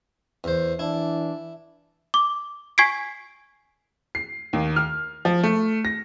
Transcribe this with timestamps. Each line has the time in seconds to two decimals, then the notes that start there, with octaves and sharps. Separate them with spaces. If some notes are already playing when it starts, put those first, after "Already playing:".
0.44 E2 C5
0.79 E3 D4 E4
2.14 D6
2.78 G#5 C#6 G#6 B6 C7 D7
4.15 C7
4.53 D#2
4.76 F6
5.25 F3
5.43 A3
5.85 A#6